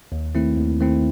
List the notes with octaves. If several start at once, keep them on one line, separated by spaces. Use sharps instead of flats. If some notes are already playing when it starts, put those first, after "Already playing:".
D#2
D#3 A3 C4 E4
D#2
D#3 A3 C4 E4